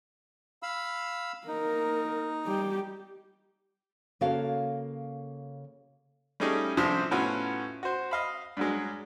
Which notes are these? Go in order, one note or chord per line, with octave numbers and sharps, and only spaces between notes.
F5 B5 E6
A#3 D#4 A#4
G3 G4
C#3 A#3 F#4 A4 C#5 F5
G3 A3 C#4 D#4 G4 G#4
A1 G2 C3 F3 C5 D#6
A2 B3 C#4 F4 F#4
F#4 C5
D#5 F5 B5
G2 F#3 G#3